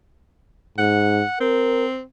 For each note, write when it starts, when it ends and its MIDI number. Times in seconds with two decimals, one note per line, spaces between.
0.78 1.22 44
0.78 1.38 78
1.40 2.02 60
1.40 1.85 70